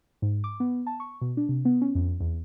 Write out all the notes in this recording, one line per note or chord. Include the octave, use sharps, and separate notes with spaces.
G#2
D6
B3
A5
C#6
B2
D4
C3
B3
C#4
F2
E2